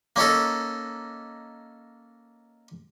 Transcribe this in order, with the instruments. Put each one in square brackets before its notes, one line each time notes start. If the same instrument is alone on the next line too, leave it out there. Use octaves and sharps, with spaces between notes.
[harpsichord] A#3 C#4 D#4 A4